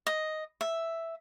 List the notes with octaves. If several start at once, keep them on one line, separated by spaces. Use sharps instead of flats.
D#5
E5